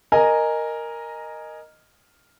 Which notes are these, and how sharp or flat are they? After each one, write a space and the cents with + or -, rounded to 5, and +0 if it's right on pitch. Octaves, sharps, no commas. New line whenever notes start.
A#4 +0 D#5 -10 G#5 +0